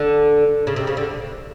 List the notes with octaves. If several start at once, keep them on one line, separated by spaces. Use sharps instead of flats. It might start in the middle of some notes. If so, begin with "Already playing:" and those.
Already playing: D3
C#3
C3
C#3
D3